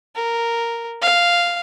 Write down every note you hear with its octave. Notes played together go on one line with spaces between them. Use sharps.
A#4
F5